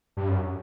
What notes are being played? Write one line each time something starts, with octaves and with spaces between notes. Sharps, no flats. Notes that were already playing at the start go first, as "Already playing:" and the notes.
G2
F#2